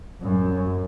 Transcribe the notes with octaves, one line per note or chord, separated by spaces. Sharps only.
F#2